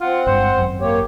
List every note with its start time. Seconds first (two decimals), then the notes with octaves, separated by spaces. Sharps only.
0.01 C4 F4 F#5
0.26 G1 G2 G#3 C5
0.57 G#1 F#2
0.81 A#3 G4 C#5